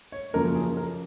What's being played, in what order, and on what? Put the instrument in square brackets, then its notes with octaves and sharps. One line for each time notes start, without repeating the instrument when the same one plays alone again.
[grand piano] C#5
F#2 C#3 F3 A#3 A#4
G#4
A#4